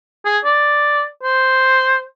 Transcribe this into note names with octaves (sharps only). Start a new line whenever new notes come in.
G#4
D5
C5